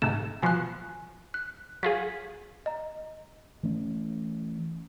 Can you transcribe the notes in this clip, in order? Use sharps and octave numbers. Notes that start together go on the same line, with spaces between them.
G#2 C3 A3 E7
B2 F3 G#5 F#6
F#6
F#3 F4 G#4 B6
D#5 A#5
E3 A3 C#4